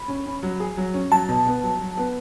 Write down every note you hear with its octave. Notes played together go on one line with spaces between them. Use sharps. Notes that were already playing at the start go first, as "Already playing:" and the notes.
Already playing: B5
C#4
C#4
F#3
G#4
F#3
C#4
F#3 A5
B2
B3
F#3
F#3
B3